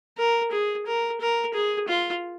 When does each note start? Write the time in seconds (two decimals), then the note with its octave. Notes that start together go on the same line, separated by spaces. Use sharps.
0.18 A#4
0.52 G#4
0.86 A#4
1.21 A#4
1.54 G#4
1.88 F4